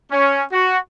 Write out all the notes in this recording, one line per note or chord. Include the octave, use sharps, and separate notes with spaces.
C#4
F#4